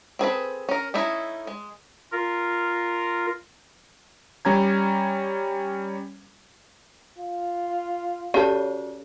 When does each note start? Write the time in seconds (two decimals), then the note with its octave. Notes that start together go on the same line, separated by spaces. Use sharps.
0.19 C4 G#4 A4 B4
0.69 C#4 A#4
0.94 A3 C#4 D#4 E4
1.47 G#3
2.12 F4 A#4
4.45 G3 C#4 A#5 G#6
7.18 F4
8.34 C#3 F#4 G4 A4 C#5 D5